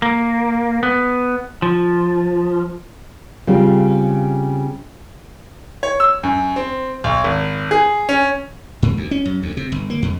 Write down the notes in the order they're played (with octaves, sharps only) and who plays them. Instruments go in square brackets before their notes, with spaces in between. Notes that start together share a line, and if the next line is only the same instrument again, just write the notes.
[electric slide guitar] A#3
B3
F3
[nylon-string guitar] C#3 G3 C4 F4
[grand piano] C#5
E6
F#2
C4
B1
G#1
G#4
C#4
[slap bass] G#2
D2
C#4
F#2
D2
C3
G1
A#3
F2